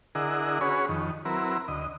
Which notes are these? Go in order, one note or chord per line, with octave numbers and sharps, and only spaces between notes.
D3 E4 G#4 A#4 D#5 F#5
C#4 F#4 G#4 B4 C#5
F2 D#3
F#3 C4 E4 A#4 B4
D2 D#5